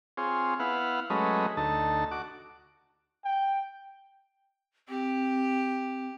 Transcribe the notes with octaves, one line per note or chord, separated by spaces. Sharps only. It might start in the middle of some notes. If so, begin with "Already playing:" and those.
C4 F4 G#4 C#5
B3 E4 F5 F#5
F#3 G#3 A3 C#4 B4 D#5
D2 A3 D#4 A5
F#4 D6
G5
C4 G4